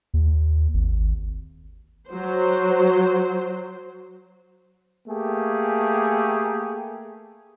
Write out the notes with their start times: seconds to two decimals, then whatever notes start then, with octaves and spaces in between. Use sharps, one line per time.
0.14 D#2
0.74 G#1
2.09 F#3 C5
5.07 A3 A#3 G4 G#4